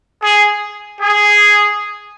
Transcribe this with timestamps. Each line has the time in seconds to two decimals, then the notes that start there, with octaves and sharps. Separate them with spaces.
0.22 G#4
0.98 G#4